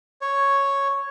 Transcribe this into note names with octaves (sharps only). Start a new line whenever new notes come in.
C#5